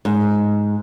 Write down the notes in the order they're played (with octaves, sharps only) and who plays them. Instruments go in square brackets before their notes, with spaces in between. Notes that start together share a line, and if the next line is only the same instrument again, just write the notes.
[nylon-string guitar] G#2